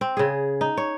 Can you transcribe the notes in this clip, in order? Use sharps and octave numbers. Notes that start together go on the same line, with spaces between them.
C4
C#3 G#4
D#4
C#5